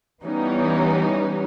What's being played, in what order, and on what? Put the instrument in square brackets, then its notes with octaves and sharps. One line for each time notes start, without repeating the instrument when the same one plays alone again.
[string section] E3 G3 B3 C#4 D#4